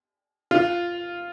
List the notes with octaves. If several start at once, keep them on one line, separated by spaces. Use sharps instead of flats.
F4